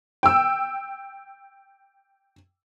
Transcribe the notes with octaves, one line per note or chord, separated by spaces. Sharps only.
G5 E6